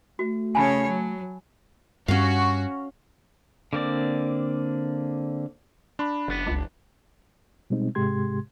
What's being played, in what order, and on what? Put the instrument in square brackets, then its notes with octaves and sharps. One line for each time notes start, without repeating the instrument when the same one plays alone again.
[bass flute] A3 [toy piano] F#4
[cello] C#3 C#5 [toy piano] G#5 A5 B5
[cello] F#3
[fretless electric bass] G2 [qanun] C#4 F5 [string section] F#4
[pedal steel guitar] D3 A#3 C4 D5
[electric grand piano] D4 [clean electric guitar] B5
[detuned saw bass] F#1 [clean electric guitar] F#2 B3
[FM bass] C#2
[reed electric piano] B2 G3 G#3 C4 D#4
G#2 C3 G#3 G4 C6 G#6